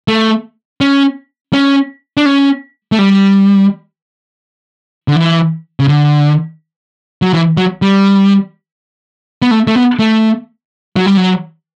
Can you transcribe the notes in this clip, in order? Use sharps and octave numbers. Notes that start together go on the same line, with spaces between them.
A3
C#4
C#4
D4
C#4
A3
G3
D3
E3
C#3
D3
F#3
E3
F#3
G3
B3
A3
A3
B3
A3
F#3
G3
F#3